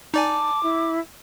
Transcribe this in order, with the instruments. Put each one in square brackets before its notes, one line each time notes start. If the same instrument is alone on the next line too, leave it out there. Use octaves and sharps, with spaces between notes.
[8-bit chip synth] D#4 D5 G#5 [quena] A5 [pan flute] D6
[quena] E4